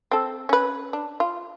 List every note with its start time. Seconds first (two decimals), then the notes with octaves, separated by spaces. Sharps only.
0.11 C4 A4
0.49 C#4 B4
0.93 D4
1.20 F4